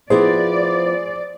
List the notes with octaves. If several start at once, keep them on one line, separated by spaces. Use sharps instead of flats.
F3 B3 E4 G#4 C5 D5